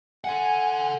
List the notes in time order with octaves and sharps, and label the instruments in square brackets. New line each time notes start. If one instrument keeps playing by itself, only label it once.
[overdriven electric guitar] A4 F#5 [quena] G#5